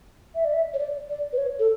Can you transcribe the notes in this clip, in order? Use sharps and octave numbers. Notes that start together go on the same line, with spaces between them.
E5
D5
E5
C#5
D5
D5
B4
C#5
A4